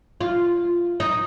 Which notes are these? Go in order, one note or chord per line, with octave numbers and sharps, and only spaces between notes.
F4
D#4